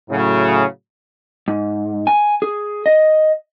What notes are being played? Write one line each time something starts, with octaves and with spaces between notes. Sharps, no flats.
A2 C#3 F#3
G#2
G#5
G#4
D#5